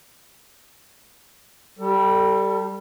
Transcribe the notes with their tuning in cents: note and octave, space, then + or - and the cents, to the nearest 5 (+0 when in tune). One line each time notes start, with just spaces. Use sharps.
G3 -5 A4 +30